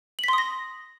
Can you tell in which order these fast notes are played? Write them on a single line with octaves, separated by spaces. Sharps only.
F#7 B6 C6 D#6 A#6